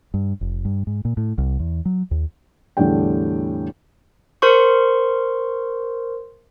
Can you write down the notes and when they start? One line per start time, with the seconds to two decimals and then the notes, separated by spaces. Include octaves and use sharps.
0.14 G2
0.41 F1
0.65 G2
0.87 G#2
1.05 A#2
1.17 A2
1.38 C2
1.59 E2
1.85 F#3
2.11 D#2
2.77 E2 A2 D3 G3 D4 G5
4.42 A#4 C5 C6 C#6